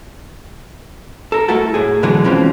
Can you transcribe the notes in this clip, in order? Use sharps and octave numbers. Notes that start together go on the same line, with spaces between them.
A4 A#4
A3 E4 F#4 A4
A2 G#4
B2 D3 E3 F#3 G#3
B2 E3 F3 C4 C#4 C5